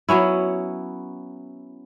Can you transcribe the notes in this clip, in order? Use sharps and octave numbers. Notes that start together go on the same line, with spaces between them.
F#3 B3 C#4 E4